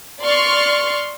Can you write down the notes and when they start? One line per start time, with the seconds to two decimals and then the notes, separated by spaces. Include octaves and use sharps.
0.21 D5 C6 C#6 F6